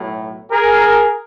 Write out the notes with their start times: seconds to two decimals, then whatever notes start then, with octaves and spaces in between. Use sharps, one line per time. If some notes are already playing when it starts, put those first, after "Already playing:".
Already playing: B1 A2 F#3
0.50 G#4 A#4